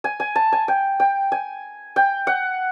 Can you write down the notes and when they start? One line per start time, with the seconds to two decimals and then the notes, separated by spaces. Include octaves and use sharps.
0.04 G#5
0.20 G#5
0.35 A5
0.52 G#5
0.68 G5
1.00 G5
1.32 G#5
1.96 G5
2.27 F#5